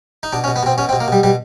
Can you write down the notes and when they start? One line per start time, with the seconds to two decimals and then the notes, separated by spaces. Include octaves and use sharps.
0.23 D#4
0.33 B2 D4
0.44 C#4
0.48 B2
0.56 B3
0.63 B2 C4
0.78 B2 C#4
0.89 C4
0.93 B2
1.00 A#3
1.08 B2 G3
1.23 B2 G3